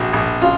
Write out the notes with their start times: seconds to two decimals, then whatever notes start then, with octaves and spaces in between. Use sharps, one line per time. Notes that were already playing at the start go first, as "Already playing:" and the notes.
Already playing: A#1 F#4
0.13 A#1
0.41 C#3 F4